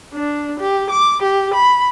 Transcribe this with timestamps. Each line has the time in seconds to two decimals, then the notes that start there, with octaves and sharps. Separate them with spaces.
0.14 D4
0.60 G4
0.91 D6
1.22 G4
1.54 B5